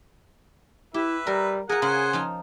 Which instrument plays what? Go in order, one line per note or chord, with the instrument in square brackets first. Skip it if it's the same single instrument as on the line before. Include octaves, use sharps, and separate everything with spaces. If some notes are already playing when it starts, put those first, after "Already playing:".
[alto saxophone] E4 [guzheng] G4 [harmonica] B4 E5
[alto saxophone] G3 [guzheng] A#4
[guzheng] F4 A#4 [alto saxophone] G#4 [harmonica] F#5
[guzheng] C#3 [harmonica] C5 F#5 G#5
[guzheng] F3 D#4 F4